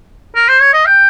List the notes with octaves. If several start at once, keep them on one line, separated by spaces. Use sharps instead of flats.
A#4
C5
C#5
D#5
G5